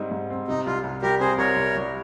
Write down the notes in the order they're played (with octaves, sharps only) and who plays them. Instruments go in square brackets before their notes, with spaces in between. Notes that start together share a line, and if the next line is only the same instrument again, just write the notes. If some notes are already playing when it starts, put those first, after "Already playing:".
Already playing: [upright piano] G#2 G3 C4 D#4
G#2
C4
[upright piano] C3 [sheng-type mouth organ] D#4
[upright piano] C2 [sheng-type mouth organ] F4
[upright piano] C2
[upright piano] G3 [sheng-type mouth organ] G4 A#4
[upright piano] C3 [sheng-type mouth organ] G#4 C5
[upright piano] C2 [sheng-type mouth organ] A#4 C#5
[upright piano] C2
G3